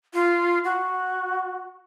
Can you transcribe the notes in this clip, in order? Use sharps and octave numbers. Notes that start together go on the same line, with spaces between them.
F4
F#4